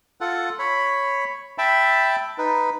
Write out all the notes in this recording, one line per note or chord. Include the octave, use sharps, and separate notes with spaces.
F4 A4 F#5
C#5 B5
E5 G5 A5 B5
D#4 B4